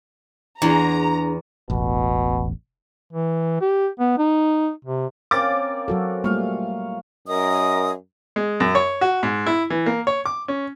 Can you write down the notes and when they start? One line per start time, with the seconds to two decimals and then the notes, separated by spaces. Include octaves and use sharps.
0.62 E2 D4 G#4 A#5
1.70 E1 A1 B2
3.13 E3
3.61 G4
3.99 B3
4.18 D#4
4.85 C3
5.31 A#3 C4 C#4 D6 A6
5.88 F#3 F#4 A4
6.24 G3 A3 A#3 F4 F5 C#6
7.28 F#2 A#4 D#5 D#6
8.36 G#3
8.60 F#2
8.75 C#5
9.01 F#4
9.23 G#2
9.46 E4
9.70 E3
9.86 A#3
10.07 C#5
10.25 D6
10.48 C#4